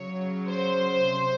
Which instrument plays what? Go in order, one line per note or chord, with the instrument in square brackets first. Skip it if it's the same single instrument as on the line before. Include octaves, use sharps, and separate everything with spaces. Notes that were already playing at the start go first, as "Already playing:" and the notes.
Already playing: [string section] C#3 F#3 C#5
C5
C3